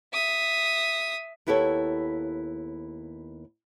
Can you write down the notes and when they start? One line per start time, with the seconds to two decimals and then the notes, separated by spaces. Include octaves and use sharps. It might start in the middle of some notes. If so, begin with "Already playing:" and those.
0.13 E5 D#6
1.47 D#2 B3 E4 G4 A4 C#5